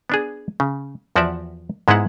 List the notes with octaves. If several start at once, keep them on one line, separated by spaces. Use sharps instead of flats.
B3 D4 G#4
C#3
E2 F3 F#4 B4 D5 E5
G#2 G#3 B3 D#4 E4 F#5